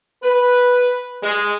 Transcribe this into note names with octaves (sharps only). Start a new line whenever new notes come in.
B4
G#3